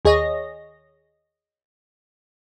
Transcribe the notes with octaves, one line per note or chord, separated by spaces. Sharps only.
D#2 G#4 C#5 D#5 A#6